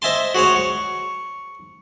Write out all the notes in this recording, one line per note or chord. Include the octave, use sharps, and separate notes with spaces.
C5 D#5 E5 G#5 A5 C6
F#4 G#4 C5 C#5
C#6